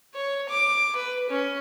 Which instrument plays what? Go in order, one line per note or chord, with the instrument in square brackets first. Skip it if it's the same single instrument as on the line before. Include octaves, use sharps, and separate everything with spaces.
[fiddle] C#5
D6
B4
C#4